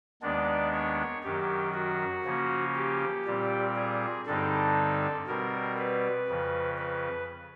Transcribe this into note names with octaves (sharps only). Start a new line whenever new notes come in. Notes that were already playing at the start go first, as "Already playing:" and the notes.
D#2 D#3 G#3 B3 D4 D5
C#5
F#2 D#3 F#3 G4
F#4
C#3 F3 A#3 C#4
G4
A#2 G3 C4
G#4
G2 D3 G3 C4 D#4 A4
B2 G3 C4 A#4
B4
F2 C#3 F3
B4